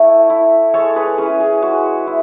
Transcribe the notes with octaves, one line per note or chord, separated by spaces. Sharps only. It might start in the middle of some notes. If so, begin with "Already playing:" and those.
Already playing: A3 E4 C#5
E4
G#3 A4 C#5
G#4 B4
C#4 E4 G#4
G#4
G#3 F#4
E4